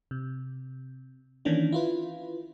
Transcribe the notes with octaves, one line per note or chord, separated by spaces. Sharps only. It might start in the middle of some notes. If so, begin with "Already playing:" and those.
C3
D#3 E3 A#3 C#4 D4
E4 F4 B4